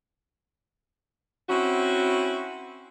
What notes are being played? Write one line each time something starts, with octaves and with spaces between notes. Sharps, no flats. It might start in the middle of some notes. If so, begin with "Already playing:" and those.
C4 C#4 E4 F#4